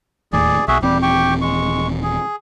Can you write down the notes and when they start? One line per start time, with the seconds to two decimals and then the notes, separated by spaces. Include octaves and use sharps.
0.33 D1 D#2 A2 G#4 D5
0.68 B1 F#4 G#4 E5
0.82 D#1 E3 G3 C4 G4
1.02 G4 G5 C#6
1.41 G#3 C#6
2.03 G#4